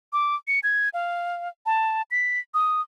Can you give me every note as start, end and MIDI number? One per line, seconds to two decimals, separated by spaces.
0.13 0.35 86
0.48 0.60 97
0.63 0.89 92
0.94 1.49 77
1.66 2.02 81
2.11 2.39 95
2.54 2.81 87